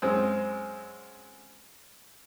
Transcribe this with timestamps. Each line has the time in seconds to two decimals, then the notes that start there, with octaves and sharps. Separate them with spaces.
0.02 F#2 G#3 C4